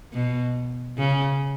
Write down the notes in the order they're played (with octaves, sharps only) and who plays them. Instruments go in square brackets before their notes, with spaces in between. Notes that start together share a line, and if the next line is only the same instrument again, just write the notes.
[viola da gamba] B2
C#3